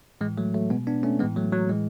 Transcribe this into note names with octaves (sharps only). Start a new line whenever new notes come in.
A2 E3 G#3
F#3 A3
F#3 A3
B2 G#3 B3
B3 D4
A3 C#4
A2 E3 G#3 B3
F#3 A3
F#3
A2 E3 G#3